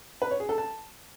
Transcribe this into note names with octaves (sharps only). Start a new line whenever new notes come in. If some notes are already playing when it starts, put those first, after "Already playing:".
B4
C#5
G#4
A4
A5